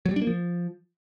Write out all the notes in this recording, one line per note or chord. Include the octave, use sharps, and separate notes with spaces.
F#3
G3
D4
A#3
F3